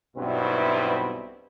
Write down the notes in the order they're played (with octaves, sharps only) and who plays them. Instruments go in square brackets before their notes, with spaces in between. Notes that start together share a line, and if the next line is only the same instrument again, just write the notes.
[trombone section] B1 G2 B2 C4 E4 B4